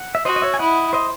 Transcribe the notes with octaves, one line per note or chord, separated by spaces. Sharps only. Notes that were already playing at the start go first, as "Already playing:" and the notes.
Already playing: F#5
E5
F#4 C5 D#5
D#5
C#5 E5
G#5
E4 D#5 F#5
C5 D#5